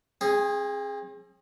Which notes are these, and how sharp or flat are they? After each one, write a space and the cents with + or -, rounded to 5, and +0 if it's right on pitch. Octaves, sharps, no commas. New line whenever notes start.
C4 +40 G#4 -5